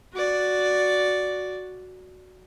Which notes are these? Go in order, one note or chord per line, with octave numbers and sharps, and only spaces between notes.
F#4 D5